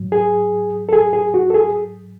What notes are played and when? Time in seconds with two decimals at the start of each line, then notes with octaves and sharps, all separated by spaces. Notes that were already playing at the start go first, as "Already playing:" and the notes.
Already playing: G#2 F#3
0.12 G#4
0.89 A4
0.92 G#4
1.13 G#4
1.34 F#4
1.50 A4
1.54 G#4